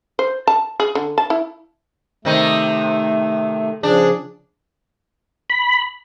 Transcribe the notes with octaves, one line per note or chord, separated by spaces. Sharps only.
C5
A5
G#4
D3
A5
E4
C3 D#3 A3 D#4
C#3 F3 D4 G#4
B5